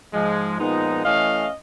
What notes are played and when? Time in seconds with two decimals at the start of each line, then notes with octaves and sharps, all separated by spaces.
0.14 G#2 F3 G#3
0.59 A#2 F3 G#3 B3 D#4
1.04 E3 A3 C#4 D#5 F5